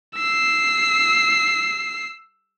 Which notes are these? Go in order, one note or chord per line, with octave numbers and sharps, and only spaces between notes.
E6 C7